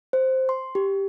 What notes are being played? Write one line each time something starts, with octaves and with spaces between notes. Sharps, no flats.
C5
C6
G4